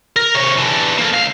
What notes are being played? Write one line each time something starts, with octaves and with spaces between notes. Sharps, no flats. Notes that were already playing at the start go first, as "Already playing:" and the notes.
A#4
C3 C#5
E3 D4
A#3 A4
C#2 F5